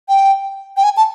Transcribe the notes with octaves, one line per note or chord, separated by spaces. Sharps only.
G5
G5
G#5
A5